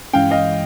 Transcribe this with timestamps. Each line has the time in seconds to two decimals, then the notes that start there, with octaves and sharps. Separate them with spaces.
0.13 G2 E3 G#3 C#4 F5 G5
0.31 D#5 F5